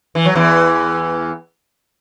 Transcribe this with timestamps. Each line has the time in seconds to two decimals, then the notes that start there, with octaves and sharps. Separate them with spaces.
0.15 E3
0.26 F#3
0.35 E2 E3